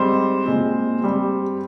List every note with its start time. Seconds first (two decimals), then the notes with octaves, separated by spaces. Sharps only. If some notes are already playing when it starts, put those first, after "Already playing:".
Already playing: G#2 G3 C4 C5
0.46 A#2 G#3 C4
1.01 G2 G3 C4